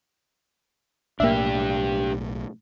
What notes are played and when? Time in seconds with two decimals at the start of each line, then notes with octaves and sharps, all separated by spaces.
1.20 B1 A2 A#3 D4 G4 E5